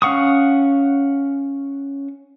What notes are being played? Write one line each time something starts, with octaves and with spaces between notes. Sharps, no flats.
C#4 F5 F#5 C#6 D#6